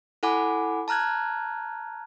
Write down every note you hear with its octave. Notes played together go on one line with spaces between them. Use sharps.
E4 A4 F#5 G#5 B5 D6
A5 A#5 F6 F#6 G#6